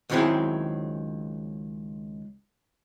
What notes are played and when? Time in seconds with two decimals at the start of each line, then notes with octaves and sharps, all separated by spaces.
0.10 C#2 D#3 F#3 C4 E4 G#4